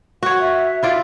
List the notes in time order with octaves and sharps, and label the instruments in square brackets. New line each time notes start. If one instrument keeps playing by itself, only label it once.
[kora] F#4 C#5 [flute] F#5
[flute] E5
[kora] E4 F4 D5